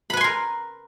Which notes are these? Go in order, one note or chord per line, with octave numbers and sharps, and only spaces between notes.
A#4 B4 G#5 B5 C6